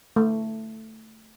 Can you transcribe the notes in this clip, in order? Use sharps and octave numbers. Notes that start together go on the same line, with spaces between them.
A3